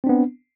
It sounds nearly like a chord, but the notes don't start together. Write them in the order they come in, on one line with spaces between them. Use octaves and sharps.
C4 D4 B3